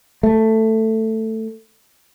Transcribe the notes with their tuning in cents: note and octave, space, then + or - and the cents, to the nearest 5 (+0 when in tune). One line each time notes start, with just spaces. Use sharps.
A3 +10